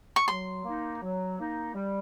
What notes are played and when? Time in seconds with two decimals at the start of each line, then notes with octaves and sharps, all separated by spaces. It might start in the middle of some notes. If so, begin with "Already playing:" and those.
0.16 C#6
0.28 F#3 C6
0.65 A#3 D#4
1.02 F#3
1.39 A#3 D#4
1.75 G3